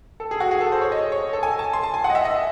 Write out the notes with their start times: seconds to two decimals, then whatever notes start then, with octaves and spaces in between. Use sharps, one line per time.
0.20 A4
0.31 G#4
0.40 F#4
0.51 G#4
0.61 A4
0.72 C5
0.81 C#5
0.92 D#5
1.12 C#5
1.33 A4
1.43 G#5
1.59 A5
1.73 C6
1.83 A5
1.94 G#5
2.04 F#5
2.10 D#5
2.15 E5
2.25 D#5